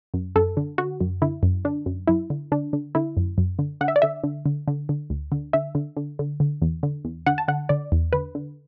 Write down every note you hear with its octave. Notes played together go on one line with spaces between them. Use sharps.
F#2
F#2 A4
D3
D3 F#4
F#2
D3 E4
F#2
D3 D4
F#2
F#2 E4
D3
D3 D4
D3
D3 E4
F#2
F#2
D3
D3 F#5
E5
D5
D3 E5
D3
D3
D3
D3
D2
D3
D3 E5
D3
D3
D3
D3
E2
D3
E2
D3 F#5
A5
D3 F#5
D3 D5
E2
D3 B4
D3